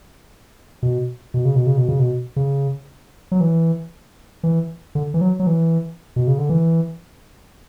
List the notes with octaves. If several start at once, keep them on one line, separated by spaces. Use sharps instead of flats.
B2
B2
C#3
B2
C#3
B2
C#3
B2
C#3
F#3
E3
E3
D3
E3
F#3
F#3
E3
B2
C#3
D3
E3